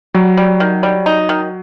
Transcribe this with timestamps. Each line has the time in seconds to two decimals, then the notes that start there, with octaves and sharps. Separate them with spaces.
0.14 F#3 G3
0.37 G3
0.60 D#3
0.83 G3
1.06 D#4
1.29 D#3